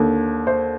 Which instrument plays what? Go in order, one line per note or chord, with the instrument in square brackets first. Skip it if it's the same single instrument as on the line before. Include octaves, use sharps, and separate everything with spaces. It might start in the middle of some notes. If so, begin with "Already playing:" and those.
Already playing: [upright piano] D#2 D3
C5